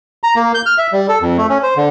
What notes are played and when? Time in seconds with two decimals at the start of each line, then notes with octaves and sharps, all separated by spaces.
0.24 A#5
0.36 A#3
0.54 G6
0.66 F6
0.78 E5
0.93 G3
1.09 A4
1.21 F2
1.38 A3
1.49 C#4
1.63 C5
1.76 D3